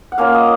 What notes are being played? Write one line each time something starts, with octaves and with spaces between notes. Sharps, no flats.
F#5
A#3 C#4 F4 F5
D#5